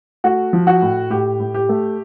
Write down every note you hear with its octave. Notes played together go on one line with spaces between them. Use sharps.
A3 F#4
F3
F#4
A2
A2 G4
A2
G4
A3